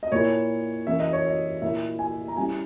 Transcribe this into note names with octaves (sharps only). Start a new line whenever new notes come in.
D#5
A#2 A#3 E4 C#5
E3 A#3 C#4 E5
D#5
C#5
D#5
A#2 A#3 E4 E5
G#5
A#5
G3 C#4 E4 G#5